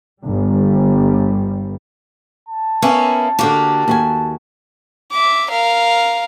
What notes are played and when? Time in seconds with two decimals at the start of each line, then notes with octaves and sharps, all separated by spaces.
0.25 G1 G3
2.49 A5
2.82 A#3 B3 C#4 E4
3.39 D3 A#3 F#4 G4
3.88 D#2 F#4 G#5
5.12 E5 D6
5.51 A#4 F5